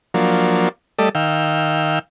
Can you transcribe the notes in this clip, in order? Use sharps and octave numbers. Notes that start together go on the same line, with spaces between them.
F3 F#3 A#3 D4
G3 A3 A4 D5 D#5
D#3 F5 G5 E6